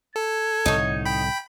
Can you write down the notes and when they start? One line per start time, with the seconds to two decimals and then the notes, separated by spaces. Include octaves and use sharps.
0.16 A4 G#6
0.66 C2 A2 D3 D#4 C#5
1.06 G5 B5